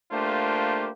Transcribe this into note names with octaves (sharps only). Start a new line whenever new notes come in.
A3 A#3 D4 F4 G4 C5